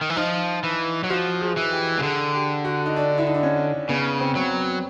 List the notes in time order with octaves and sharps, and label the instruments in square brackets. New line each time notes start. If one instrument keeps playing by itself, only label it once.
[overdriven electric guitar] D#3
E3
[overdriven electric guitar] F3 [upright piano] D#4
[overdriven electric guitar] E3
F#3
[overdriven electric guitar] F3 [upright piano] F#4
[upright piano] G#4
[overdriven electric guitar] E3
[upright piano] G4
[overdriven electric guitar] C#3
[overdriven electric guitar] D3 [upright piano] G#4
[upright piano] G4
F#4
D#4
D4
E4
D#4
D4
C#4
[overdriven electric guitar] C#3 [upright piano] B3
[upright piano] C4
[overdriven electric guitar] F#3 [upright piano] B3